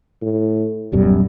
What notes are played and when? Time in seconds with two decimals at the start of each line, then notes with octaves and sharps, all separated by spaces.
0.22 A2
0.92 D1 F#2 B2 G3